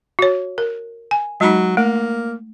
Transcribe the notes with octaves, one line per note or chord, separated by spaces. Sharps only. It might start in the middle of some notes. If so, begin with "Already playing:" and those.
F#4 C#5
A#4
G#5
F#3 G#3 D#4
A3 A#3